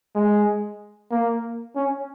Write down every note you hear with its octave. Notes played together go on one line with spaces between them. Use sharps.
G#3
A#3
C#4